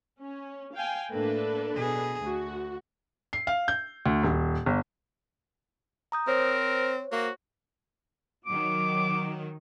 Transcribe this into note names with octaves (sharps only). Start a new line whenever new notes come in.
C#4
F5 G5 G#5
A2 A#3 D4 A4 B4
B2 G#4
D2 F#4
C7
F5
G6
D2
D#1
G1
A#5 D#6 G6
C4 A#4 C5 C#5
A#3 F#4
D#3 F#3 D6